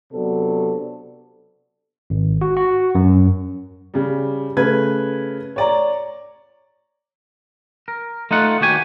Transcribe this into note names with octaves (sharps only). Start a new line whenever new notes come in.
C3 F#3 B3 C4 D4 A4
G#1
F#4
F#4
F#2
C#3 G3
C#3 A3 B4 G#6
C#5 D5 A#5
A#4
A3 D#4 F4 F#5
D#2 F#4 G4 G#5